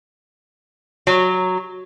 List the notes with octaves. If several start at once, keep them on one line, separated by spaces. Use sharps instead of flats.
F#3